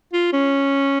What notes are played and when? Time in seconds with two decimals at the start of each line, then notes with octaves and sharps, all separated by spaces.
0.13 F4
0.33 C#4